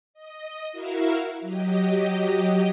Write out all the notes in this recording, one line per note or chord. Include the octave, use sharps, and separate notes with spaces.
D#5
E4 F#4 A#4 E5 F5
F#3 G4 D#5